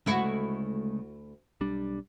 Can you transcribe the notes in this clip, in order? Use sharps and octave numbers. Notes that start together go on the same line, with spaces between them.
D2 C#3 G#3 A3 E4 F#4
B1 G3 D4